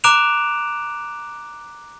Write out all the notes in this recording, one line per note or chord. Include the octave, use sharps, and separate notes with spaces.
A#5 D6 F#6 D7 E7 F7